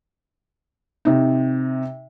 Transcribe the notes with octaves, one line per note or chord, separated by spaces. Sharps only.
C3 D#4